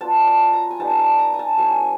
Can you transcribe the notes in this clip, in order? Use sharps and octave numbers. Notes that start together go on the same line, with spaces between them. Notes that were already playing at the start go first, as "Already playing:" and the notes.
F#3 B3 D4 F4 A5
A5
A#5
G#5
G3 B3 D#4 A5
A#5
A5
A#5
G#5
A5
F#3 A3 C#4 E4 G#5